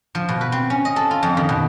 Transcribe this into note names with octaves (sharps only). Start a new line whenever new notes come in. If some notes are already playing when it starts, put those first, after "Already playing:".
F3
B2
B4
C4
C#4
D#5
A4
F4
F2
D#3
B2